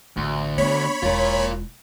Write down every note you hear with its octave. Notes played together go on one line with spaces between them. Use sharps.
A1 D2
B3 D4 C#5 B5
E1 E4 F4 A#4